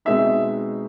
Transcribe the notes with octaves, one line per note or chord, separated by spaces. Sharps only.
B2 G#3 C4 D#4 E5